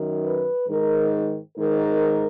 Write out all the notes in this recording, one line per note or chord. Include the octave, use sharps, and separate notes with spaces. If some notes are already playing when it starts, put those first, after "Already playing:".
Already playing: F#2 D#3
B4
G#2 D#3 A#4
G#2 D#3 A#4